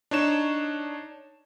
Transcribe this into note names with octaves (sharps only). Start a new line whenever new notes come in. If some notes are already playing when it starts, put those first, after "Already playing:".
D4 D#4 C#5 E7